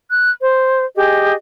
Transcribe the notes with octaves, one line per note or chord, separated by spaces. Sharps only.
F#6
C5
G4 G#4 D#5